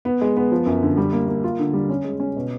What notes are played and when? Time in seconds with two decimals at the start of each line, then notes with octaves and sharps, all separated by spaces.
0.05 B3
0.21 G#3
0.36 B3
0.52 F3
0.66 F#2
0.82 D3
0.97 G3
1.13 A#3
1.28 A#3
1.44 F4
1.59 D3
1.74 G3
1.89 C#4
2.05 G#3
2.20 C#4
2.36 B2